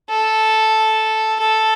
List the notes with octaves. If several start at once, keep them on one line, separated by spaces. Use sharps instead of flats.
A4
A4